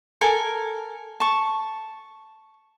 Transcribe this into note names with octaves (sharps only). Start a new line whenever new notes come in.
A4 A#4 G#5
A5 C#6